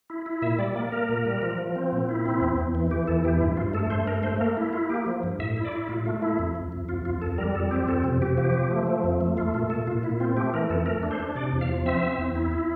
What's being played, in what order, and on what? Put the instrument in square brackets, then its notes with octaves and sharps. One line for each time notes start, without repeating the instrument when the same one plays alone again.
[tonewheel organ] E4
E4
A#2 E5
G3 D5
A#3 D5
A#3 A#4
A#2
G3
F3
F3
C4
A#2
E4
C4
E2
E2
E3
E3 G4
E2 A4
E3 G4
G2 E4
G2 F4
A3 A4
G2 C5
A3 A#4
A3 C5
A#3 A#4
E4
E4 F4
A#3 G4
F3
G2
A2 E5
E4
D5
E4
A2 F4
A3 F4
A3 E4
F2
F2
F2
F2 F4
F2 F4
F2 A4
G3 A#4
F2 A4
C4 G4
F2 A4
C3
C3 G4
F3 G4
F3
A3
F3
F2
A3
A3 F4
A#2 F4
A#2 A4
A#2 F4
A#2 E4
C4 F4
A3 G4
E3 A#4
F2 A4
A3 A#4
D4
C5
D4
C3 D5
E2
F5
F3
C4 E5
C4
E2
E4
E4